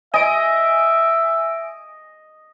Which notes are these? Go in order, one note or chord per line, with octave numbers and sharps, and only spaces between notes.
D#5 E5 G#5 D7